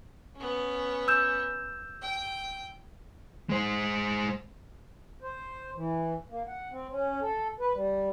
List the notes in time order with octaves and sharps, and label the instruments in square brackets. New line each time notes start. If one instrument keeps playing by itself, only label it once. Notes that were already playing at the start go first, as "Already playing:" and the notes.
[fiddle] B3 C#4
[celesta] E6 G6 E7
[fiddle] G5
[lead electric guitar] G#3 C5
[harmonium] C5
E3
A#3
F#5
C4
C#4
A4
B4
G3